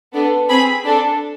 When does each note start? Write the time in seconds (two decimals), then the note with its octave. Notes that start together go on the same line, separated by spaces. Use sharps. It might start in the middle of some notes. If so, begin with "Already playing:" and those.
0.13 B3 D4 A4
0.49 C4 G#4 B5
0.85 D4 A4